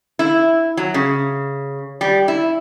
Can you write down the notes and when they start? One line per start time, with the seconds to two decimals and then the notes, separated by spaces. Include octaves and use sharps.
0.19 E4
0.77 F#3
0.94 C#3
2.01 G3
2.28 E4